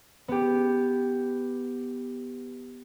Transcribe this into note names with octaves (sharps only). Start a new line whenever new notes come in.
B3 G4